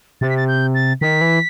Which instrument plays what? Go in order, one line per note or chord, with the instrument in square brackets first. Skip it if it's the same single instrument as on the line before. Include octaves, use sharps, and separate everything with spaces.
[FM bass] C3 [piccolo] A6
[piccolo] B6
A6
G6
A6
[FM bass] D#3 [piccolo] B6
[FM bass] E3